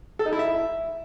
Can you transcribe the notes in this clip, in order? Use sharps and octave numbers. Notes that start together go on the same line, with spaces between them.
A4
D#4
E4
E5